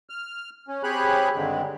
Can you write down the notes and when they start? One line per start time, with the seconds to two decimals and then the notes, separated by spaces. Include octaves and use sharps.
0.10 F6
0.68 C#4
0.83 C4 G4 G#4 C#5 B5 F#6
1.36 G2 D3 D#3 G#3 C4